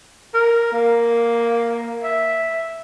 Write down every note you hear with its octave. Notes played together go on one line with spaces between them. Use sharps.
A#4
A#3
E5